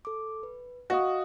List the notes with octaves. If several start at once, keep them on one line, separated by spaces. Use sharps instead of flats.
A4 D6
B4
F#4 D#5 F5 D#6